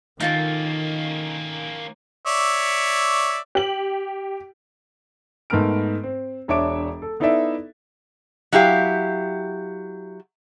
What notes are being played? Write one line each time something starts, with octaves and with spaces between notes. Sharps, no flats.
D#3 A#3 C#4 D#4 F4 A4
C#5 D5 E5
G4 F#7
G#2 A3 B3 A#4 F6 D7
C4
E1 D4 C#5 E5 D6 D7
A4
B3 D#4 E4 A4 D5 E5
F#3 E4 G4 F5